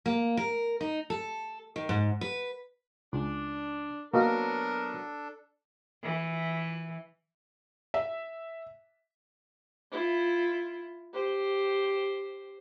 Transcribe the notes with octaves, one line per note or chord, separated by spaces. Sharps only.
A#3
A#4
D#4
A4
D#3
G#2
B4
C#2 D4
F#3 A#3 B3 D4 F#4 A4 A#4 D#5
E3
E5
E4 F4
G4 C5